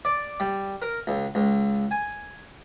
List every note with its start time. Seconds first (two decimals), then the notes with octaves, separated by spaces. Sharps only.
0.05 D5
0.40 G3
0.82 A#4
1.07 C#2
1.35 C#2
1.91 G#5